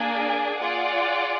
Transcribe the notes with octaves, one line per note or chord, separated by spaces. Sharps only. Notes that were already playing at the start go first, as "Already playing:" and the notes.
Already playing: A#3 D4 G#4 D5 G#5
F4 G#4 D5 F#5